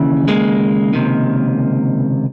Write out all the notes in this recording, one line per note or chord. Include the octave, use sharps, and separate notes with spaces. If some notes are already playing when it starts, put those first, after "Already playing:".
Already playing: D#2 C#3 E3
G#3 A#3
C#2 C3 D#3